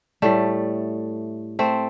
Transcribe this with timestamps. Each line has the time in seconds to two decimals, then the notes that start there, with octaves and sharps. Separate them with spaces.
0.22 A2 G3 A3
1.59 A3 C4